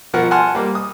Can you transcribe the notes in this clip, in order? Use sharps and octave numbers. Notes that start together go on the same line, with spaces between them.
B2 F3 A#4 F#5
F#5 G#5 A5 C6 F6
G3 A#3
D#6